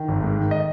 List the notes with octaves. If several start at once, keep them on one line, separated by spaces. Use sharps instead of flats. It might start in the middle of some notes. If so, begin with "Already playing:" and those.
Already playing: D#3
G#1
G#2
D#3
D#5